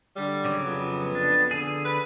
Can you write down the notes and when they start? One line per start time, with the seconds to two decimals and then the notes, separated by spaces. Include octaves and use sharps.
0.17 D3 G3
0.45 C#3 F#3 D6
0.67 F2 B3
1.15 D4
1.51 D3 G#4
1.86 B4